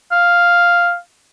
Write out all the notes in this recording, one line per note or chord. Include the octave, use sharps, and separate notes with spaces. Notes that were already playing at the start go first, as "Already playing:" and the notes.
F5